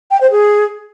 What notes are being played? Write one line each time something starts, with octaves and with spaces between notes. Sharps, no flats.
G5
C5
G#4